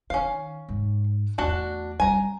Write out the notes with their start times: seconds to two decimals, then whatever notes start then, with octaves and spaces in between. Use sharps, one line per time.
0.10 D#3 C#4 F5
0.69 G#2
1.38 E2 A3 D4 F#4 A5
2.00 G3 C#4 G#5 A#5